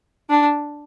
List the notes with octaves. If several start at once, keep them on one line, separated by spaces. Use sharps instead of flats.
D4